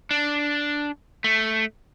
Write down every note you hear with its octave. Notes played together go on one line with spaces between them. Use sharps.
D4
A3